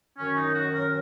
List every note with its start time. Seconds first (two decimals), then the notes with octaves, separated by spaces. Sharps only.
0.18 F#2 D#3 C#4
0.36 D#4
0.55 F#4
0.75 A#4